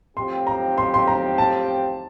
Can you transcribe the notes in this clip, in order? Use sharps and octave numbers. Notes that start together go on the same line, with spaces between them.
A2 F3 C4 G4 C6
A#5
C6
C6
A#5
A5